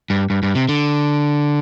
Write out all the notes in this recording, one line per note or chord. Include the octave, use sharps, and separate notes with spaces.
G2
G2
G2
C3
D3